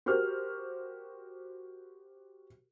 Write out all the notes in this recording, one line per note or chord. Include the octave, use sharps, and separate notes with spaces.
F#4 G4 A#4 C5 F6